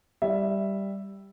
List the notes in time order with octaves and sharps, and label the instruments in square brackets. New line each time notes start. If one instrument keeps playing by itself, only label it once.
[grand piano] G3 E5